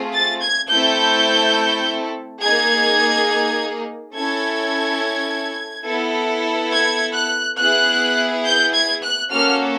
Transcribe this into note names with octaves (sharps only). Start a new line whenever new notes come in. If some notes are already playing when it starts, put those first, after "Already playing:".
Already playing: A3 C4 F4 G#4
A6
G#6
A3 C4 E4 A4 G6
A#3 D#4 G#4 G#6
C#4 E4 A4 G#6
B3 E4 A4
G#6
F#6
B3 E4 G#4 F#6
G6
G#6
F#6
A#3 C#4 F#4 A4 F6